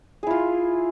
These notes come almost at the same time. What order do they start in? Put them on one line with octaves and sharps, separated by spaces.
G#4 E4 F4